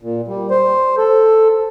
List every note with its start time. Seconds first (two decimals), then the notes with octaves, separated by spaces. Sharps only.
0.01 A#2
0.28 G3
0.50 C5
0.98 A4